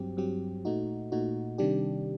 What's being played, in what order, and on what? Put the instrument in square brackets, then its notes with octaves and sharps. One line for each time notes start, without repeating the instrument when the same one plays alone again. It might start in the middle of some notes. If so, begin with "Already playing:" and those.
Already playing: [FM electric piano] G2 F#3 C4 G4
G2 F#3 C4 G4
A#2 A3 D#4 F#4
A#2 A3 D#4 F#4
C3 D#3 G3 D4 G4